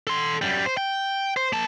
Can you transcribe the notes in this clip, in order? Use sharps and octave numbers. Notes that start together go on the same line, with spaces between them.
A4 C6
F#2 G3
C5
G5
C5
A#3 A5